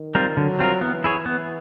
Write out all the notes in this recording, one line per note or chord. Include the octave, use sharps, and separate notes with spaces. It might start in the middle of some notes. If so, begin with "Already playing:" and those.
Already playing: D#3
G3 C4 F4 A#4
D3 F#3
G3 C4 F4 A#4
E3 B3
E4 G#4 C#5
B3